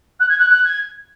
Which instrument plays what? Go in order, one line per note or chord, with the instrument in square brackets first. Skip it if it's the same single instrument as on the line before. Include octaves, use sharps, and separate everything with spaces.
[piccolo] F#6
G#6
F#6
F#6
G#6